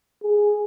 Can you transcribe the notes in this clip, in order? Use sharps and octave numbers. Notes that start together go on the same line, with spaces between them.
G#4